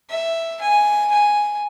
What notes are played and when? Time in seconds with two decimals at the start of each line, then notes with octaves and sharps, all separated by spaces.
0.10 E5
0.61 G#5
1.12 G#5